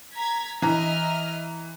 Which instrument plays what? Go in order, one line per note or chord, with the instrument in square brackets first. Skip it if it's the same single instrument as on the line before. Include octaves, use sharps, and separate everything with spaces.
[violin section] A#5 G#6 B6
[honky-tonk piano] E3 A#5 [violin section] D#5 E5 F6